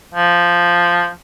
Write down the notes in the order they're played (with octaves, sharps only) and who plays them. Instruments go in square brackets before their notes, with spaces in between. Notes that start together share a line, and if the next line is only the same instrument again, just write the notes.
[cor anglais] F3